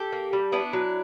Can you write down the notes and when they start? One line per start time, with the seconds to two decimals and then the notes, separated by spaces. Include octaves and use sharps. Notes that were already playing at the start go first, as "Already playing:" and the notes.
Already playing: G4 A4
0.12 A#3
0.33 G3
0.52 B3 D4 E4
0.73 F#3